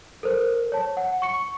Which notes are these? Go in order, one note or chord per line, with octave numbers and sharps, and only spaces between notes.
A4 A#4 C5
C#5 A5
F#5
C#6 C#7